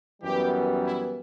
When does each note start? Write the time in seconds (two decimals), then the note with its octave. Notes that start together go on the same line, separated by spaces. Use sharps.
0.22 F#2 E3 G3 B3 G4
0.84 E4